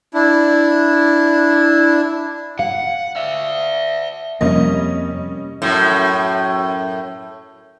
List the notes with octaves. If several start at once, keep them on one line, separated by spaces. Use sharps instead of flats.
D4 E4
F5 F#5
D5 E5
F2 C3 G3 A#3 C#4 D#5
F#2 A2